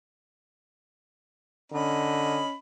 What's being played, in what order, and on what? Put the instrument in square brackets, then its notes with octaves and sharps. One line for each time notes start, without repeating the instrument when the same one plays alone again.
[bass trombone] D3 [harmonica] C#4 D#5 B5